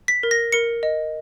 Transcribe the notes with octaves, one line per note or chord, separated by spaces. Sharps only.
B6
A#4
A#6
A#4 C#7
D#5